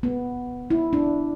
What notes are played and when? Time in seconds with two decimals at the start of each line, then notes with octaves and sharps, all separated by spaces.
0.03 B3
0.71 E4
0.93 D4